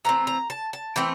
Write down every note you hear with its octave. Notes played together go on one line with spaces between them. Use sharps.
E3 A3 C4 A#5
A#5
A5
A5
E3 A3 C4 G5